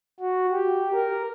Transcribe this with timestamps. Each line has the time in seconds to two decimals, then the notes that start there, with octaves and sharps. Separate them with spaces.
0.20 F#4
0.52 G4
0.94 A#4